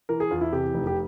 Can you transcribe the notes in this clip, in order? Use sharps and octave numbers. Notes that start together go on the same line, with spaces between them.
E3 A#4
G#4
E2 F4
E4
C3 G4
F1
G4